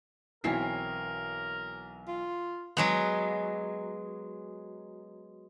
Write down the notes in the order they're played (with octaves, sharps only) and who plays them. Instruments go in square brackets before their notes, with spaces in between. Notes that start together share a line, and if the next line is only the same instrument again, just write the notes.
[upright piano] B1 G#5 C7 [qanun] E3 C4 C#5 [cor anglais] A#4
[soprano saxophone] F4
[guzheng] F#3 G#3 B3